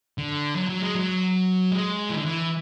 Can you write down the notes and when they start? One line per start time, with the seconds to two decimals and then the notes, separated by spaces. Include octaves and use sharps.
0.18 D3
0.56 F#3
0.69 F#3
0.82 G#3
0.95 F#3
1.72 G#3
2.10 E3
2.17 D3
2.26 E3